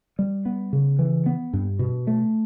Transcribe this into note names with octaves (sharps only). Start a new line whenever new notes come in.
G3
B3
C#3
E3
B3
G2
B2
A3